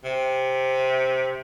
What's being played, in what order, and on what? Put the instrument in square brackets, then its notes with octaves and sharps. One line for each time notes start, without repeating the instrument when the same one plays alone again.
[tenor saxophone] C3